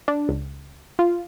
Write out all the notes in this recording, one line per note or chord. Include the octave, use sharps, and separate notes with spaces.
D4
C#2
F4